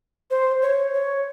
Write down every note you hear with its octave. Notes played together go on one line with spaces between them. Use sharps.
C5
C#5
C#5